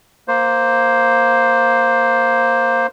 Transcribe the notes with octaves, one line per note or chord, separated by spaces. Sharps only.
A#3 C5